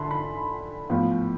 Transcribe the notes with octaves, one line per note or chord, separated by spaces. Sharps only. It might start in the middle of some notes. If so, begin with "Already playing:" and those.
Already playing: D3 E4 A5 B5 C6
B5
A2 F3 B3 F4